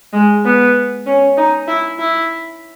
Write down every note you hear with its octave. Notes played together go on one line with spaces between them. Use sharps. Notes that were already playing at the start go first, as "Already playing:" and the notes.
G#3
B3
C#4
D#4
E4
E4